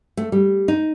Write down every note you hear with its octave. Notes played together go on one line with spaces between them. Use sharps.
A3
G3
D#4